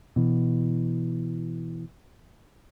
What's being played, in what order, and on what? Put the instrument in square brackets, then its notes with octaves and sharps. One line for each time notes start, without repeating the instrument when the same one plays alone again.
[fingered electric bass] B2 E3